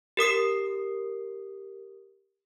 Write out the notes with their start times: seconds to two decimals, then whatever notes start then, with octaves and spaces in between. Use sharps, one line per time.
0.17 G4 A#4 D#6 C7